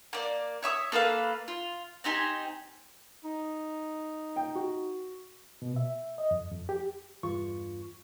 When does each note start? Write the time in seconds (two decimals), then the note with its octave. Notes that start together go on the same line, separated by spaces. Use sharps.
0.13 A#3 D5
0.62 C#5 E5 C#6 D#6
0.92 A#3 A4 B4 F5
1.48 F4
2.04 C4 D#4 G4 G#5
3.24 D#4
4.36 G5
4.55 F#4
5.62 B2
5.76 E5
6.18 D#5
6.31 F2
6.51 F2
6.69 G4
7.23 E2 G2 F4 C#6